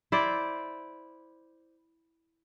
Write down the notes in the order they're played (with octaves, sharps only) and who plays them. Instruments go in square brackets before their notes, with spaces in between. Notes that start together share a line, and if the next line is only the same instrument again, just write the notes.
[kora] E4 C5 D5